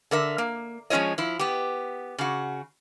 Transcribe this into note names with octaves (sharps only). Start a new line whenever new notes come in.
D3 A#4 E5
A#3
F3 G#3 C#4 F4 C#5 D#5
F3 E4
B3 G4
C#3 F#4